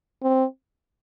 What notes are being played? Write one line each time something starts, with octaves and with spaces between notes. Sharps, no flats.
C4